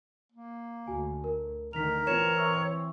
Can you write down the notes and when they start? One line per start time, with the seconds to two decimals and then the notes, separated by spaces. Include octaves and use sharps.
0.32 A#3
0.87 D2 F#4 G#5
1.24 A#4
1.73 D2 D#3 A#4 B6 F7
2.07 E3 C4 F4 B4 C#5 E7
2.37 E5 C#6 E6